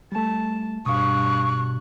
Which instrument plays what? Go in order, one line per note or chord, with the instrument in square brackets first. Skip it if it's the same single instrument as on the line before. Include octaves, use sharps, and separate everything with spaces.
[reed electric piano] G3 A3 [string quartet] A5
[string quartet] G2 F#6 [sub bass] B2 [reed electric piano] F5 D#6 [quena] C#6